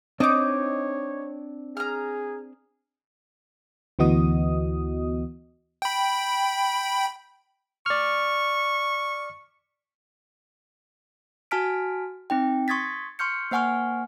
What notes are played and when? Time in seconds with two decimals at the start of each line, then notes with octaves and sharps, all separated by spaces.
0.20 C4 D4 D#4 C#5 D#5 D6
1.77 G#4 A#5 F6
3.99 D2 E3 B3 F#4 D#5 D#6
5.82 G5 B5
7.86 D5 C#6 F6
11.51 F#4 G#5 A5 F6 B6 D7
12.30 C4 D#4 G5
12.68 C6 C#6 D#6 G#6 A6 B6
13.19 C6 C#6 F6 G6 C#7
13.51 A#3 C5 F#5 G#5 C#6 F6